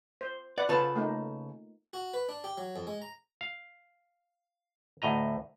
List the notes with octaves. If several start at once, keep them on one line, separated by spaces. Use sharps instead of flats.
C5
B4 D5 F#5
C#3 F4 A4 B4 C#5 A5
A3 A#3 D#4
F#4
B4
D4
G4
F#3
F2
G#3
A#5
F5
D2 A2 D#5 A#5